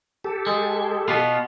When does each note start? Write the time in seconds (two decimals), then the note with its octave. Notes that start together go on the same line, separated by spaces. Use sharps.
0.24 G4 A4
0.47 G#3
1.08 B2 B3 F4